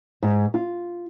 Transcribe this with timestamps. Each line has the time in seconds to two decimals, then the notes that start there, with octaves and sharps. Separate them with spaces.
0.23 G#2
0.54 F4